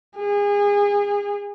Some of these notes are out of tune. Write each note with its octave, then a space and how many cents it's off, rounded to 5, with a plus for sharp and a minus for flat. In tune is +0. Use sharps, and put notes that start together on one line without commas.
G#4 -30